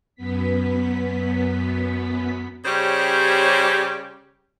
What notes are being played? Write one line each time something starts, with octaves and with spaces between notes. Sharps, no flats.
F#2 B3 B6
C#3 G3 C#4 G4 C5